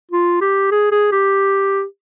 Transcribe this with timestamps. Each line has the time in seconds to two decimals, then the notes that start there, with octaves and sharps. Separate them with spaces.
0.11 F4
0.41 G4
0.71 G#4
0.92 G#4
1.12 G4